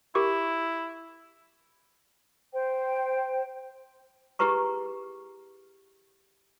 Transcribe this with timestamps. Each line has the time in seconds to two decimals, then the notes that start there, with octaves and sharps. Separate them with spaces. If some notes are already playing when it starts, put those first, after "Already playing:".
0.15 E4 G4 A#4 C#6
2.53 C5 G5
4.39 E4 G4 G#4 B4 A#5 C#6